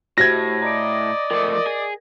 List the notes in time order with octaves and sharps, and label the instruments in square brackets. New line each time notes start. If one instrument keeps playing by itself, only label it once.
[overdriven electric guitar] A2 [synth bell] F#4 G4 C5 [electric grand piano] G#6 A#6
[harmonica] D5 D#5 [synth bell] A#5 D7
[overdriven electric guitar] F3 A3 [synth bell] A#4
[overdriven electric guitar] G#4